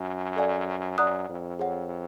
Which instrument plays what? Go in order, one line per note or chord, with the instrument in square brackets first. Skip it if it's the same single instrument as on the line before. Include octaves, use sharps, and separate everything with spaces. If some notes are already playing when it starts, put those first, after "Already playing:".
Already playing: [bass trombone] F#2
[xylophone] A4 D5 F5 G#5
[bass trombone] F#2 [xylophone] D5 F#5 A#5 D#6 F#6
[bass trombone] F2
[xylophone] G#4 C#5 F#5